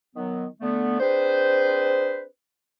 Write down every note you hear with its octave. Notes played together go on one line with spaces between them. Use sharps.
D#3 F#3 B3
D3 A3 B3
C4 D4 G#4 B4 C5